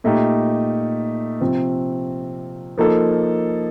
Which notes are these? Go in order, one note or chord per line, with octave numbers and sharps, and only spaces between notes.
A#2 A3 D#4 G4
C3 F3 C4
F3 A#3 D#4 A4